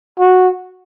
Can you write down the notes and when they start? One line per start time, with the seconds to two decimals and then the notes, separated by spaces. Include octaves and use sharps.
0.19 F#4